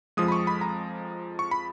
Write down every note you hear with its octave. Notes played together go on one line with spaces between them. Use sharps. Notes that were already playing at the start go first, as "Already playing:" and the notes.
F2 F3 G#3 D#6
B5
C#6
B5
A#5
C#6
B5